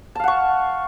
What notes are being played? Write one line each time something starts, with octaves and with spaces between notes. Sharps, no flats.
F5 F#5 A5 C#6